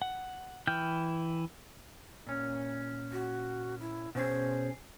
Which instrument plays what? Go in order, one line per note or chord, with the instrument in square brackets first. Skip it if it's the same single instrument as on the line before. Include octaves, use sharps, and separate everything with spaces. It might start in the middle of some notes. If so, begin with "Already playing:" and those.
[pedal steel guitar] F#5
E3 E4 G5 F6 G6
[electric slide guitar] A#2 C#4
[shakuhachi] F#4
E4
[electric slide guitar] B2 C#4 G#4 [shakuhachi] C5